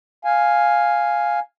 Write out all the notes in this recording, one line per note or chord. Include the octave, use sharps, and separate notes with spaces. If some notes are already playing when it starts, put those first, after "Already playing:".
F5 G#5